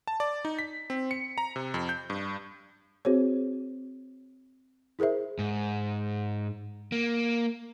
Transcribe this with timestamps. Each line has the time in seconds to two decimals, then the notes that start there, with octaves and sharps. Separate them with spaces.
0.07 A5
0.20 D5
0.45 D#4
0.59 B6
0.90 C4
1.11 C#7
1.38 A#5
1.56 C3
1.74 F2
1.89 G6
2.10 G2
3.05 C4 F#4 G#4 C5 C#5
4.99 E4 G#4 A#4 C5 E5
5.39 G#2
6.92 A#3